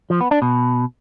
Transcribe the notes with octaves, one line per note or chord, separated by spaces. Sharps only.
F3
B3
D4
B2